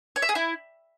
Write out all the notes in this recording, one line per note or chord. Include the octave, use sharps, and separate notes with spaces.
C#5
E5
G#4
E4